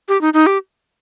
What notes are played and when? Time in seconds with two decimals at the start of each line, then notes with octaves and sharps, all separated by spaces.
0.09 G4
0.21 D#4
0.34 D#4
0.47 G4